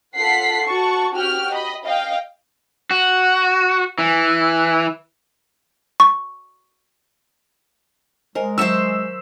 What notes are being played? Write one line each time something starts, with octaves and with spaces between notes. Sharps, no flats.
F4 A4 F#5 B6 C7
F#4 A5 C#6
F#4 G4 G5 F6
D#5 B5
D#5 F5 G5
F#4
E3
C#6
G#3 A#4 C5 D#5 G#5
D#3 F#3 C5 E5 C#6 E6 E7